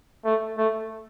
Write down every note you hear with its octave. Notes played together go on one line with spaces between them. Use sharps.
A3
A3